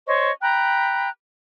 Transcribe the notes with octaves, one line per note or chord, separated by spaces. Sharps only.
C5 C#5 D#5 C#6
G5 A#5 B5 F#6